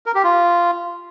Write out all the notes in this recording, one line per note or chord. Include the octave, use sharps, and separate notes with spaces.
A#4
G4
F4